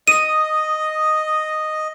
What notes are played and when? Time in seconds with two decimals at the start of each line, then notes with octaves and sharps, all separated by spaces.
0.07 D#5 D#6 D#7